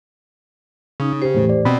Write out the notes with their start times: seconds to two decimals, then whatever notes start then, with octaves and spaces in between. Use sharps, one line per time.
1.00 C#3 C#4 D#4
1.22 G4 C5
1.34 E2 A2 E3
1.49 D5
1.65 B2 B3 C4 B5